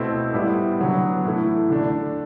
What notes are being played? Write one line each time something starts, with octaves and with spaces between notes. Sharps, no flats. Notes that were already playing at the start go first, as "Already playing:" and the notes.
Already playing: B2 A3 C4 E4
A2 G3 B3 E4
D3 F#3 B3 E4
A2 E3 A3 E4
D3 A3 D4